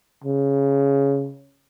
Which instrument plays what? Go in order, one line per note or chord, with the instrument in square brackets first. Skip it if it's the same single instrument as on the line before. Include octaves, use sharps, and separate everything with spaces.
[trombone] C#3